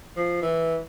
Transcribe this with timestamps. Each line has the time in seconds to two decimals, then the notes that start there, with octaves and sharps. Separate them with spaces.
0.16 F3
0.42 E3